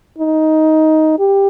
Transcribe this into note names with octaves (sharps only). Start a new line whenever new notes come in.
D#4
G4